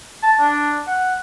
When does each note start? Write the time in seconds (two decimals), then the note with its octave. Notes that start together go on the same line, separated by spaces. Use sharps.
0.23 A5
0.40 D4
0.87 F#5